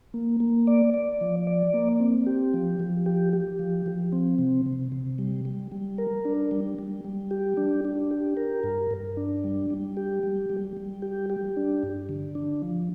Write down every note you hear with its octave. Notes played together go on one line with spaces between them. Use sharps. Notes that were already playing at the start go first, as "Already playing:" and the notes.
A#3
A#3
D5
D5
F3
D5
A#3
C4
G4
F3
F3
G4
G4
F3
F3
C4
C3
C3
C3
G3
G3
G3
A#4
D4
G3
G3
G3
G4
D4
D4
G4
A#4
G2
G2
D4
G3
G3
G4
G3
G3
G3
G4
G4
D4
G2
D3
D4
F3